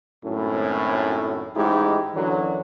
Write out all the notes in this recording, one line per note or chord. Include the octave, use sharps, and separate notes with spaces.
G#1 F#2 A2
A1 G#2 G#3 D#4 E4 G4
F#2 D3 E3 F#3